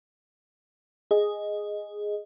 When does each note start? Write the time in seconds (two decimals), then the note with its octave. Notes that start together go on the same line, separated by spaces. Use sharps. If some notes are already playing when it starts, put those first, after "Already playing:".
1.11 G#4 D#5